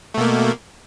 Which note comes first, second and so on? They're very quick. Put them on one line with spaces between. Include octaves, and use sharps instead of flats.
A3 B2 A#3